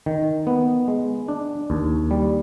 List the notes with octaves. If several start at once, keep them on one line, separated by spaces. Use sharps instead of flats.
D#3
B3
G#3
D4
D#2
G3